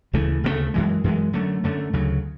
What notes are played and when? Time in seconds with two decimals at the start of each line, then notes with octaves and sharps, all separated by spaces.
0.13 D2 C#3 E3 A3
0.44 D2 C#3 E3 A3
0.74 F#2 E3 G#3
1.04 F#2 E3 G#3
1.33 F#2 D3 A3
1.64 F#2 D3 A3
1.93 D2 C#3 F#3